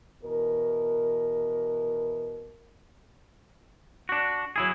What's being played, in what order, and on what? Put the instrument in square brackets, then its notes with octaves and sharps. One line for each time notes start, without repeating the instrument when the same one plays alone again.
[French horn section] B2 E3 A#4
[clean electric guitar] D4 F#4
F#3 E4 G#4